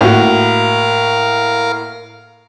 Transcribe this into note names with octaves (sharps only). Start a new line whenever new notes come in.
A2 A#3 F#4 A#4 F5